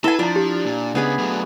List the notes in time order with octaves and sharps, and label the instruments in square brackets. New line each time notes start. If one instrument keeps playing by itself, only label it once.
[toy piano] E4 F#5 [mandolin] A4 G#5 [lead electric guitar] B4 [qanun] E5
[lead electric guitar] F3 [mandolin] D4 [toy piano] F4 A#5
[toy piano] G4
[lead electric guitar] A#2
[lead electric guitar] C#2 C#3 [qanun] B3 G#4 B5
[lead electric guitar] F#3 A3